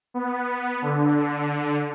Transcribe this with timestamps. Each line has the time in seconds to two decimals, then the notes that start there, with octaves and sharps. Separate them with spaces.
0.14 B3
0.82 D3